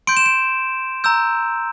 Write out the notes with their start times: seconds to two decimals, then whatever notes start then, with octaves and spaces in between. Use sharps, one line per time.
0.07 C6 G6 D7
0.17 E7
0.26 D7
1.04 A#5 E6 G6